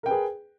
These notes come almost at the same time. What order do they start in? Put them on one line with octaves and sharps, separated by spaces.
A#4 G5 B4 G#4